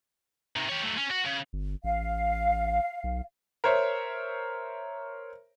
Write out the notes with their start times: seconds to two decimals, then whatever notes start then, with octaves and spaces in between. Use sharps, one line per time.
0.56 C3 D#3
0.69 G4 C#5
0.83 F#3 A3
0.98 C#4
1.11 F#4
1.25 C#3
1.53 G1
1.84 A1 F5
3.04 B1
3.64 A#4 C5 C#5 E5